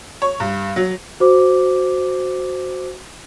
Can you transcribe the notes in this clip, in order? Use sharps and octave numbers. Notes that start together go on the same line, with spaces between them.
C#5
G2
F#3
F#4 C5 D6